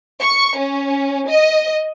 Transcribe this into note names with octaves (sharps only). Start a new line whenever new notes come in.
C#6
C#4
D#5